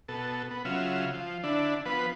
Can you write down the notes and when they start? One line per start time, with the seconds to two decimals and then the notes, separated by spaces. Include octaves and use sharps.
0.08 B2 A4
0.51 B3
0.65 C#3 F#3 F4 E5
1.14 F3
1.43 D3 D4 E4
1.86 F3 B3 B4